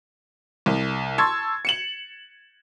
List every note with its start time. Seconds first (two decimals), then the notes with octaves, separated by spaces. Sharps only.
0.66 C2
1.18 A5 C6 C#6 E6 G#6 A6
1.65 C#7 E7 F#7